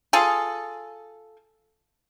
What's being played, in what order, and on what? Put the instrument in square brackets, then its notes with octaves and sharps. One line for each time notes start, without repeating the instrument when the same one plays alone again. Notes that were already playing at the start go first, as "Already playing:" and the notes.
[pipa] F4 G#4 A4